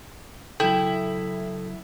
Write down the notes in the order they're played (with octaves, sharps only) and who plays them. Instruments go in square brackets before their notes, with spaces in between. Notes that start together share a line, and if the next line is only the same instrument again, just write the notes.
[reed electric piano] C#3 F#3 [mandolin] E4 [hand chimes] A4 [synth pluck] G5